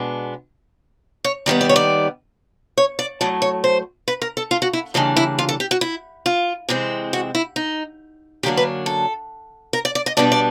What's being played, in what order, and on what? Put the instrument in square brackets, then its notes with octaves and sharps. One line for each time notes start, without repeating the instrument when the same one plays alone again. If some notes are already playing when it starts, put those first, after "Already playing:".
Already playing: [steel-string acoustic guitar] B2 G#3 B3 D4
C#5
D#2 D#3 G3 B3 D5
D5
C#5
D5
C#5
D5
A2 F#3 A3 D5
C#5
C5
B4
A#4
A4
F4
F#4
E4
C#3 E3 G3 A#3 D4 D#4
E4
F4
A4
G4
F#4
E4
F4
C3 E3 G#3 C4
F#4
E4
D#4
F#2 D3 F#3 A#3 D4 G4
B4
A4
A#4
D5
D5
D#5
B2 G3 B3 D4 D5
D5